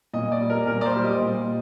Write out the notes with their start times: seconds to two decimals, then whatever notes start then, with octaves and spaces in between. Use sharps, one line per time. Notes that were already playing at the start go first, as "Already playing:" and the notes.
0.14 A#2 D#5
0.32 D5
0.40 G3
0.50 A#4
0.67 A#2 A#4
0.81 D5
0.86 C5
0.93 G3
1.04 D#5
1.21 A#2